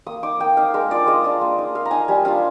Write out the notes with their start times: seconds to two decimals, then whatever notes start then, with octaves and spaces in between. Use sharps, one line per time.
0.07 A#3 D#6
0.23 D#4 D6
0.40 A#3 G5
0.57 D#4 F5
0.74 G#3 A#4
0.91 D4 F4 D5
1.07 G#3 D#5
1.24 D4 F4
1.41 A#3
1.58 D#4
1.75 A#3 F5
1.85 A#5
1.91 D#4 G#5
2.08 G3 G#5
2.25 D4 F4 F5